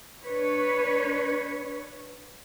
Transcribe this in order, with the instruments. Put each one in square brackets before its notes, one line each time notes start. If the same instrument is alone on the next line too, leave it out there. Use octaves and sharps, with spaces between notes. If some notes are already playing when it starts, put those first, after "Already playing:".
[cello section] D4 B4 C#5